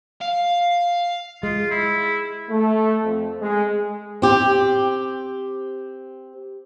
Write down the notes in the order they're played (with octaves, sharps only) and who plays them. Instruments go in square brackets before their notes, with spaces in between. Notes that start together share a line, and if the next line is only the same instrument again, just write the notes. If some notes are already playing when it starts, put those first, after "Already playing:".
[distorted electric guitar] F5
[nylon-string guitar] G#3 [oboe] F4
[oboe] E4
[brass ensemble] A3
F2
G#3
[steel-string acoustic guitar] C4 G4